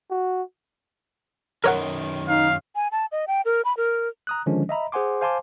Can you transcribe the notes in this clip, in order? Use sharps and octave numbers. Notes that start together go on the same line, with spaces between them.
F#4
F#2 D#3 A#4 C#5 F#5
D#4 F5
G#5
A5
D#5
G5
A#4
B5
A#4
A#5 D#6 F#6
D3 D#3 F3 G#3 C#4 D4
D#5 E5 A#5 B5
G#4 C5 F#5 G#5 C6 D6
C5 F5 G#5 A5 C6 D6